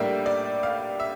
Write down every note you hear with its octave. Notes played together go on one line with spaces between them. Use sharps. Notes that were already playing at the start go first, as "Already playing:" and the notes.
Already playing: A2 G3 A#3 D4 E5
D5
F5
E5